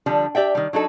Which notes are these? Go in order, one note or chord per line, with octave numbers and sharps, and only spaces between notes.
D3 F3 G3 D4 A4
G4 D5 E5 G5
D#3 G3
F#3 D4 D#4 A4